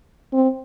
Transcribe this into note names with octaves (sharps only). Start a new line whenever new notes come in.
C4